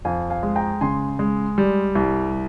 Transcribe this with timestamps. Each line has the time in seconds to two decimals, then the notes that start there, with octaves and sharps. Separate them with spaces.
0.05 F2 F5 G#5
0.30 F5 G#5
0.43 G#3
0.56 G5 A#5
0.81 C#3 G#5 C6
1.19 G#3
1.58 G3
1.95 C2